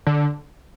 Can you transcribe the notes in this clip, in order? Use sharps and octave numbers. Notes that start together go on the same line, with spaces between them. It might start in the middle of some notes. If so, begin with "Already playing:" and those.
D3